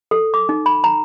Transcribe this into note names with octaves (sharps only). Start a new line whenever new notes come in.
A4
D6
D#4
B5
A#5